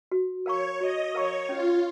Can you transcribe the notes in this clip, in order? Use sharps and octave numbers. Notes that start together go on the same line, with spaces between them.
F#4
A#4 C#5 F5 A#5 C#6
F#4 D#5
A#4 C#5 F5 A#5 C#6
C#4 F4